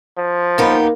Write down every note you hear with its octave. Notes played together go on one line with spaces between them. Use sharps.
F3
A#3 B3 D#4 G4 A#4 B5